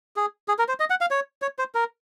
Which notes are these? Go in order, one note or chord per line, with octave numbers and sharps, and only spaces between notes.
G#4
G#4
A#4
C5
D#5
F#5
F5
C#5
C#5
C5
A#4